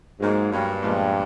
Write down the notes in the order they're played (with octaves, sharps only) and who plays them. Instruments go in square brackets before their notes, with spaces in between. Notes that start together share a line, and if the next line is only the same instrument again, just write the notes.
[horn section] G#2 [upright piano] F#3 A#3 C#4
[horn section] G2 [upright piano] F#3 A#3 C#4
[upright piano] A#2 F3 G#3 B3